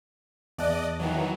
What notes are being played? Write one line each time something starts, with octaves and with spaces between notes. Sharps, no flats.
E2 D5 D#5 A5 F#6
D#3 E3 F#3